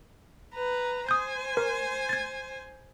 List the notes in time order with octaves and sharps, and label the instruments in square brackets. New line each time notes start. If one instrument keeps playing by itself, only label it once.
[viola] B4 A#5
[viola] C5 G#5 [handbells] D#6 G6
[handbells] A#4
G#6 A6